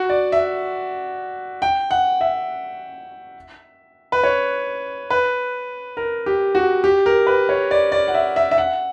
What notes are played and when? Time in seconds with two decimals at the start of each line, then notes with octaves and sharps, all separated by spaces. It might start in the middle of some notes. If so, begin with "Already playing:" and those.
Already playing: F#4
0.09 D5
0.32 E5
1.62 G5
1.91 F#5
2.21 E5
4.12 B4
4.24 C#5
5.10 B4
5.97 A#4
6.26 G4
6.55 F#4
6.84 G4
7.06 A#4
7.27 B4
7.49 C#5
7.71 D5
7.92 D5
8.08 F#5
8.14 E5
8.36 E5
8.51 E5
8.58 F#5